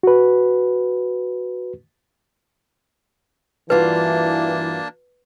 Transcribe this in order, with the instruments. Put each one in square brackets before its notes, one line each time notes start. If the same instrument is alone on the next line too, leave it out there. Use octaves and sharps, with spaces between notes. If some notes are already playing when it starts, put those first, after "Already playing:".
[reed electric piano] F#4 B4
[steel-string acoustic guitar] G2 F4 F#4 [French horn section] E3 [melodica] A#3 D4 A5 [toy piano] B4